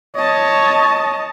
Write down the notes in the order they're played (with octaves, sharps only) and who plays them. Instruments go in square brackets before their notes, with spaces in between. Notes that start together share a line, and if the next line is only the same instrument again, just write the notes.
[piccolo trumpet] C#5 [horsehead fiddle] D#5 A5